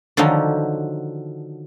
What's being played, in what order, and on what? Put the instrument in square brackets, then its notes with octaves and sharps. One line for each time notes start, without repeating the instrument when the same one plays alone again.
[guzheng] D3 D#3 F3 F#3 D#4